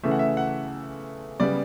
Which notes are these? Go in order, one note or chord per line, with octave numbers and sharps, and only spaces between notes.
C#3 E3 A3 E5
F#5
E5
F#5
C#3 G3 B3 D5